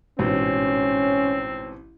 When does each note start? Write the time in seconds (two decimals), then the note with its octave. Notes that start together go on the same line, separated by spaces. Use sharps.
0.19 A1 G#2 B2 C4 C#4